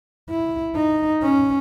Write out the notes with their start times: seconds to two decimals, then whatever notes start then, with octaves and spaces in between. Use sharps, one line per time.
0.29 E4
0.76 D#4
1.23 C#4